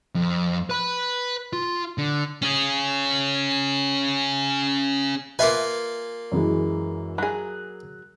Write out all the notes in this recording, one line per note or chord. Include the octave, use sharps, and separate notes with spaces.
F2
B4 B5
F4
D3
C#4 G#4
A#3 F4 B4 E5 G#5
F#2 E3 G#3
F#3 G#4 F#6